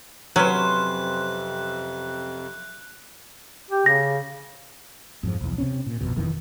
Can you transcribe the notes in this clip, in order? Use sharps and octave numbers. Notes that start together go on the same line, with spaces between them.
F2 C3 F#3 C#4 B4 C5 F#6
G4
C#3 A#6
F2 G#2 F3
B1 E2
C3 C4 C#4
A#2
A#1 F2 B2
E1 F2 D#3 E3